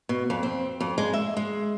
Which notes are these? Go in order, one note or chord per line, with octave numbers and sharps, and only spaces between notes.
B2
F2
C4
F2
G#3
E5
G#3